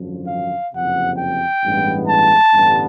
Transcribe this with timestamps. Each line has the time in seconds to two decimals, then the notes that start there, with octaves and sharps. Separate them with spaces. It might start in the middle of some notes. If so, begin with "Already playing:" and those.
Already playing: G#1 F#2 D3 F3
0.28 F5
0.73 F#1 F2 C3 F#5
1.19 G5
1.64 A1 G2 E3 G#3 B3
2.09 A5
2.54 A1 G2 D3 G3 B3